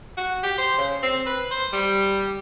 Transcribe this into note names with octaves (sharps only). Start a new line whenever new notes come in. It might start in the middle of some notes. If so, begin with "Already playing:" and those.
F#4
G4
C5
C#3
C4
B4
C5
G3